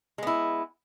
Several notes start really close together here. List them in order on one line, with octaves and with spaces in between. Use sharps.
G#3 B3 E4